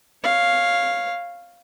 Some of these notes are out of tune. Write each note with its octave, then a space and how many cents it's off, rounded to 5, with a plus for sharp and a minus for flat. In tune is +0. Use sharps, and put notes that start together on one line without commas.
C#5 -10 F5 +0